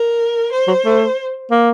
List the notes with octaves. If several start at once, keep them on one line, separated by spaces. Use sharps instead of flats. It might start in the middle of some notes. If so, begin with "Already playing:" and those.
Already playing: A#4
C5
F#3
A3
A#3